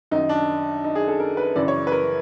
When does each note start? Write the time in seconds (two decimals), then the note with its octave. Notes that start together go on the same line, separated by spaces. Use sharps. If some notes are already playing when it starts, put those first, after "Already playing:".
0.11 F#2 D#3 D#4
0.29 D4
0.84 D#4
0.95 G#4
1.08 A4
1.20 A#4
1.37 B4
1.56 F#2 C#3 E3 D5
1.68 C#5
1.87 B4
1.92 A#4